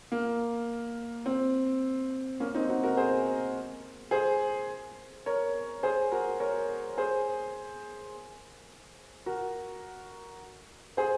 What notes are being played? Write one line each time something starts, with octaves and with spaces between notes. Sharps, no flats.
A#3
C4
A#3 C#4
C4 D#4
D#4 F#4
F#4 A#4
G#4 C5
G#4 C5
A#4 C#5
G#4 C5
F#4 A#4
A#4 C#5
G#4 C5
F#4 A#4
G#4 C5